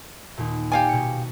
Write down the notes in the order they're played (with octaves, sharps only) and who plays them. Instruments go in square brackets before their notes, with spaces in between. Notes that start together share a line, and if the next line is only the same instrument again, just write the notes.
[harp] D#2 A#2
[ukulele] G4 F5 G#5 [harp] D5
[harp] B2 C#7